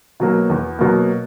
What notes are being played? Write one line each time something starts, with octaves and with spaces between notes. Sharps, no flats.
B2 F#3 A#3
E2
B2 F#3 A#3